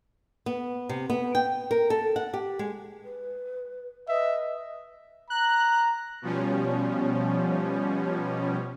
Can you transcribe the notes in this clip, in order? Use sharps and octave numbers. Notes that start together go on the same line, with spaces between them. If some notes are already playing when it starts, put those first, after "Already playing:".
B3
C3
B3
G5
A#4
A4
F#5
G4
G#3
B4
B4 D#5 E5
A#5 F#6
B2 F3 G3 C#4